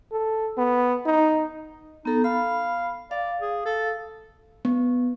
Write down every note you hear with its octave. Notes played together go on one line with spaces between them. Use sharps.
A4
B3
D#4
B3 D#4 A4
F5 B5
D5 F5
G#4
A4
B3